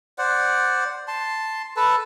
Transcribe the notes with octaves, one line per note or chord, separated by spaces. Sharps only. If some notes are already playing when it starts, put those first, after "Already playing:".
C5 D5 F#5
A5 C6
A4 B4 A5